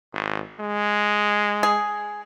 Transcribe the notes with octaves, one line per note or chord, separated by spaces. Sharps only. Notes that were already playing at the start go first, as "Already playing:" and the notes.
G#1
G#3
G#4